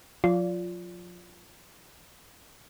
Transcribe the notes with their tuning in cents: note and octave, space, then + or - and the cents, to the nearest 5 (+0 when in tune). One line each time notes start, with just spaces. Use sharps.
F3 +45 F4 +0 D5 -25